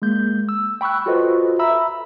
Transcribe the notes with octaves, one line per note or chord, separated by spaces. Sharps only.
G#3 A#3 G6
E6
G5 B5 C#6 E6 F#6
F4 F#4 A4 B4 C5 D#5
E5 A#5 B5 E6